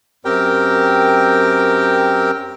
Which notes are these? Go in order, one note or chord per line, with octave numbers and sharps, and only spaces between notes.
F#2 C4 G4 A#4 G5